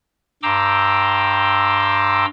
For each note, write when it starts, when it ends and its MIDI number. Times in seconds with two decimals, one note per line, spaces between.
0.43 2.25 43
0.43 2.25 79
0.43 2.25 82
0.43 2.25 84
0.43 2.25 86
0.43 2.25 88